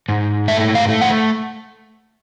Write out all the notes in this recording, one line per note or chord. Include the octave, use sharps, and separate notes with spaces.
G#2
A3 E5
F5
A3
F#5